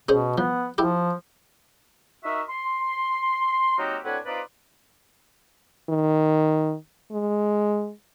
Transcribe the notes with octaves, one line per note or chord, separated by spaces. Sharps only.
B2 C#4 G#4 C5
F3 B3
F3 E4 G4
D#4 F#4 A#4 E5
C6
F#3 A#3 C4 D#4 F#4 G4
A2 C4 D4 F#4 B4 G#5
C4 D#4 F4 B4 D5
D#3
G#3